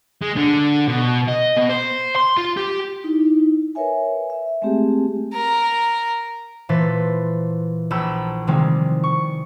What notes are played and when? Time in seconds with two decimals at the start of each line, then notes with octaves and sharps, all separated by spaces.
0.22 G#3
0.36 D3
0.88 B2
1.28 D#5
1.57 B2
1.69 C5
2.16 C6
2.37 F4
2.57 G4
3.04 D#4 E4
3.75 A#4 B4 C#5 E5 G#5
4.30 E5
4.62 G#3 A3 C4 G4 G#4
5.34 A#4
6.69 A#2 E3 A3 C5 A6 B6
7.91 A#1 G#4 A4 B5 E6 G6
8.47 C3 D#3 F3 G3 G#3 C4
9.03 C#6